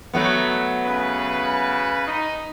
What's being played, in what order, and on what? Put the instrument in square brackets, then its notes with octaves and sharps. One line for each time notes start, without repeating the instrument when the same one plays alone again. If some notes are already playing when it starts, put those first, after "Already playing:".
[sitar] F#3 A3 B3
[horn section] C#3 B4
D#4